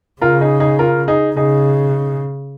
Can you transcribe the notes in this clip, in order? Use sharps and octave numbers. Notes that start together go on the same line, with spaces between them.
C#3 F4 A#4
D#4 G#4
D#4 G#4
F4 A#4
D#4 G#4
C#3 D#4 G#4